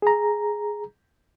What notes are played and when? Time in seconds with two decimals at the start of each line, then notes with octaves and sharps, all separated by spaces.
0.02 G#4 A#5